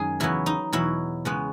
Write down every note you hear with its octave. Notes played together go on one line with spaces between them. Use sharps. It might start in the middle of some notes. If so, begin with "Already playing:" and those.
Already playing: F#2 D#3 G#3 G#4
E2 C#3 F#3 B3 E4
D#4
E2 B2 F#3 E4
C#3 G#3 B3